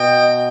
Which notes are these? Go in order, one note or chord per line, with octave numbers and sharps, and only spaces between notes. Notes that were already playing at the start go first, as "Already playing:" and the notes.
Already playing: B2 D#5 G5